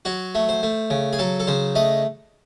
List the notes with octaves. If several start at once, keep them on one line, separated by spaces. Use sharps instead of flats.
F#3 F#4
A3
C5
A3
C#3
G#4
F#3 A4
A4
C#3 C5
A3 D#5